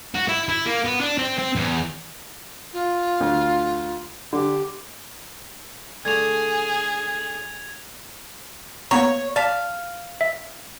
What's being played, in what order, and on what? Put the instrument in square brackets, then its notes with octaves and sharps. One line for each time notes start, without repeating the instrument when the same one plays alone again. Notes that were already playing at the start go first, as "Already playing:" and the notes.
[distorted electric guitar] F#4
E4
E4
A#3
B3
D4
C4
C4
E2
[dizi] F4
[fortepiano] D2
[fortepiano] D3 [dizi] G4
[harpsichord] D3 A3 [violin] G#4 [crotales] G#6 F7
[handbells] A#3 B3 A#5 [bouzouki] C#5
[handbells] D5 A5 B6 [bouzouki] F5
[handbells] E5